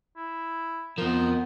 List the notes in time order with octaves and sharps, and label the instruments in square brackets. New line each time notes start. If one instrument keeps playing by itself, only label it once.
[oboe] E4
[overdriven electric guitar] F2 F3 [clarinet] B3 [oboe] D#4 [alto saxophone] A#4